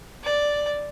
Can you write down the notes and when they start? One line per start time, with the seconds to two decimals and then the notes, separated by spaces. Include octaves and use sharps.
0.24 D5